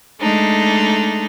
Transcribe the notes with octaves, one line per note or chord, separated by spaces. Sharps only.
G#3 A3 D4 D#4